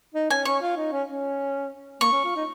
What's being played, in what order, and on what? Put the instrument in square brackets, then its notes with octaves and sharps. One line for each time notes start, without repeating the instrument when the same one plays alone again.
[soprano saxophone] D#4
[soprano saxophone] C#4 [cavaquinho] G#5
[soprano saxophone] C#4 [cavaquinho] C#6
[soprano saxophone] F4
D#4
C#4
C#4
[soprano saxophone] A#3 [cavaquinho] C#6
[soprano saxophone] C#4
F4
D#4